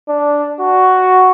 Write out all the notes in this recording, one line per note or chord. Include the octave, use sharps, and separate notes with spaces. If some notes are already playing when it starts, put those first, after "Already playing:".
D4
F#4